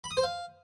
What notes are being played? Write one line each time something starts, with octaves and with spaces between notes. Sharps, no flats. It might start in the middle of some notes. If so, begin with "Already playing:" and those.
B5
D#6
C5
F5